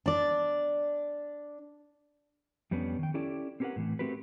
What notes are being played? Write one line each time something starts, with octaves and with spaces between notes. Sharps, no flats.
D4 D5
F2 G3 B3 C#4 D4
D#3 G5
C#4 E4 G4 A4 D5
C4 C#4 G4 A#4 B4 F#5
A2 E3
A3 C4 F#4 G4 A#4 B4